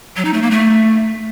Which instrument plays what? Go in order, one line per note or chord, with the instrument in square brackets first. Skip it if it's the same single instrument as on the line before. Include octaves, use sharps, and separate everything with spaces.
[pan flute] F#3
D#4
A3
A#3
A3